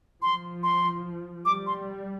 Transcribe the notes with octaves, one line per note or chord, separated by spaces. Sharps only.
F3 C6
C6
G3 D6
C6